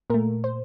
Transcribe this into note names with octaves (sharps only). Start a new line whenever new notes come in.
A#2 A3 A#4
C5